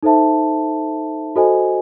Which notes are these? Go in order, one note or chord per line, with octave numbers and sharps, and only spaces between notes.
D#4 A4 C5 E5 A5
F#4 A4 C5 D#5 G#5